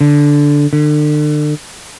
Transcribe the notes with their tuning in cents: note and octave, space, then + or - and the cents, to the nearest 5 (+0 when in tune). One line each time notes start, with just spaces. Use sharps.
D3 -10
D3 +35